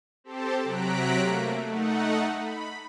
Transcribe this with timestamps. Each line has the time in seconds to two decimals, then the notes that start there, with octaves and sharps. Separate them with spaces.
0.24 C4 G4 A4 C5 A5
0.64 C3 F#3 A#5 F#6 B6 D7
1.19 A3 A#3
1.66 A3 D#4 F#5
2.35 B5